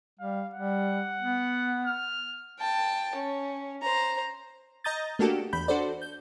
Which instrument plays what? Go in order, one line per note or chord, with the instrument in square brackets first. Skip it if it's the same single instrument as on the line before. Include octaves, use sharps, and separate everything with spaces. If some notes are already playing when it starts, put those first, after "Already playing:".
[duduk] G3 [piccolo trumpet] F5
[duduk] G3 [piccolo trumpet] F#5
[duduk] B3
[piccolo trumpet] F6
[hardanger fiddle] G5 A5
C#4
C5 A#5
[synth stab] D#5 A#5 D#6 G6 A6
A3 A#3 D4 F#4 G4 A4
E2 B5 G6
D4 F#4 A4 C5 D5
G6